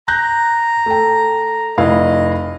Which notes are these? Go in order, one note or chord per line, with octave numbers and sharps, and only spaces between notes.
A#5 F#6 G6 A#6
A3 G5
F1 E4 D#5 F5